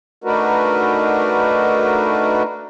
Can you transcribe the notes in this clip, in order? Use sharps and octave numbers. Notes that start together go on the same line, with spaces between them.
A3 D4 D#4 F#4 A#4 B4